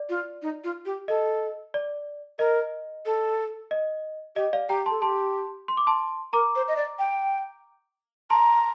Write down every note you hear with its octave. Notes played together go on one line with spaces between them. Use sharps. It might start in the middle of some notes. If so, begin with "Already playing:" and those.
Already playing: D5
F4
D#4
F4
G4
A4 D#5
D5
A#4 D#5
A4
D#5
G4 D#5
D5 F5
G4 G5 A#5
A4 A5 C6
G4 A5 C6
C6
D6
A5 C6
A#4 A#5 D6
C5
D#5
D5
G5
A5 A#5 C6